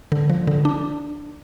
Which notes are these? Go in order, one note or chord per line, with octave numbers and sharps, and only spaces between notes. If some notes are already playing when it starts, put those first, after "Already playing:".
D3
F3
D3
D4